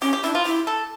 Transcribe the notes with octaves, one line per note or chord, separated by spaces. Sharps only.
C#4 G4
G4
D4 E4
F4
E4 G4
A4